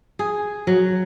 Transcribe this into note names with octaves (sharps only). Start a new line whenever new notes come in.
G#4
F#3